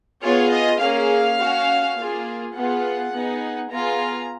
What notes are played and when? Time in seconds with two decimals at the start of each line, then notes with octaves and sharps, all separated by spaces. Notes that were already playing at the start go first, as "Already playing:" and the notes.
0.22 B3 F4 G#4 C#5
0.51 D#5
0.80 A#3 C#4 G#4 F5
1.39 C#4 F#4
1.97 A#3 F4 G#4
2.54 B3 F4 G#4 F#5
3.13 B3 D#4 G#4
3.71 B3 F4 G#4 A#5